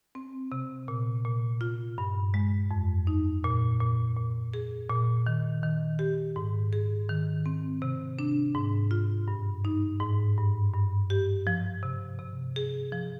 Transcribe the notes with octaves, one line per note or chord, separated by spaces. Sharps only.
C4
C3
A#2
A#2
F4
G2
G#3
F2
D#4
A#2
A#2
A#2
G#4
A#2
D#3
D#3
G4
G#2
G#4
D#3
C4
C3
D4
G#2
F4
G2
D#4
G#2
G2
G2
G4
F3
C3
C3
G#4
F3